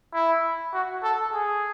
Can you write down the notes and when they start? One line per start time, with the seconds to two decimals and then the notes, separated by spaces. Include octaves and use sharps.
0.14 E4
0.74 F#4
1.03 A4
1.33 G#4